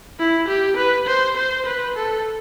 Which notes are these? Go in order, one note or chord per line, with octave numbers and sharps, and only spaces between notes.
E4
G4
B4
C5
C5
B4
A4